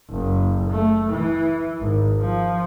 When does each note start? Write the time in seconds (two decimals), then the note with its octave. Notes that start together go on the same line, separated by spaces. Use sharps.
0.10 F#1
0.71 A3
1.09 E3
1.80 G#1
2.19 F3